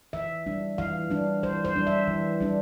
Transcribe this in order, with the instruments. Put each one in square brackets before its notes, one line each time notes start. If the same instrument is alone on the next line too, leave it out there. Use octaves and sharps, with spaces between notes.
[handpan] E3 E5
G3 D4
E3 F5
G3 D4
E3 C5
C5
G3 D4
E5
E3
G3 D4